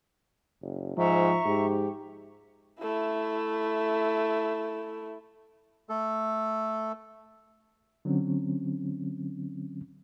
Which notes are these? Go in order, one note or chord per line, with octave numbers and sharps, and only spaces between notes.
F#1
G#2 F3 E5 A#5 C#6
G#2 G4
A3 E4
A3 A4
D3 F#3 C4 C#4